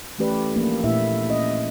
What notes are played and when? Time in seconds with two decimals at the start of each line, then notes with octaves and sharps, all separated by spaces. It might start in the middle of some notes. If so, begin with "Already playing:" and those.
0.19 E3 A3 C#4 G4 B4 D5
0.56 F3 A#3 D4
0.84 A#2 A3 A#3 E4 E5
1.28 C#4 D#5